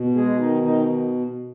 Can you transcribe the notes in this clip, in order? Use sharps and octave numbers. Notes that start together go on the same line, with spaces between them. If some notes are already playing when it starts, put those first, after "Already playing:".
Already playing: B2
G#3 G#4
D#3 D#4
D#3 D#4